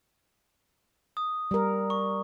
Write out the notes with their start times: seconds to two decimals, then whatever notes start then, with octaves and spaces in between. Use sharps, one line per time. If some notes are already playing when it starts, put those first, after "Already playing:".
1.17 D#6
1.51 G3 A#4
1.90 C#6